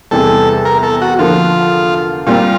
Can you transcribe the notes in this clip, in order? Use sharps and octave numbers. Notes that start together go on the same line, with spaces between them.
E2 C3 E3 G3 C4 A4
A#4
A4
F#4
D3 F3 A#3 F4
A#2 G3 C4 F4